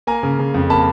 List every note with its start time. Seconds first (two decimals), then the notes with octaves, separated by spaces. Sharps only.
0.07 A#3 G#5 A#5
0.23 C#3
0.39 C#3
0.54 F2
0.70 A#3 A5 B5